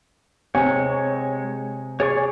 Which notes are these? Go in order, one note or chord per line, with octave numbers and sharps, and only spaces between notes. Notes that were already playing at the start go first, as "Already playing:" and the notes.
C3 G#3 C#5 G#5
G#4 C#5 D5 C#6